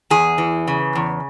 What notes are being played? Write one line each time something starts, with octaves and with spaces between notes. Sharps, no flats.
E2 G#4
E3
C#3
E2